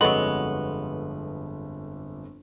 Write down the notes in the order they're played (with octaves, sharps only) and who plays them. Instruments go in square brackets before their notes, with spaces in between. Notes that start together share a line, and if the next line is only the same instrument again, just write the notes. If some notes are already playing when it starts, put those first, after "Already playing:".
[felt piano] G1 F2 [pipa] F#3 B3 [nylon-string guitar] G#3 [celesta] A4 C6 F#7